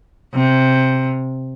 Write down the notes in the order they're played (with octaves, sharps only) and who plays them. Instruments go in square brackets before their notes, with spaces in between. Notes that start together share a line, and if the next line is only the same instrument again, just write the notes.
[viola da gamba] C3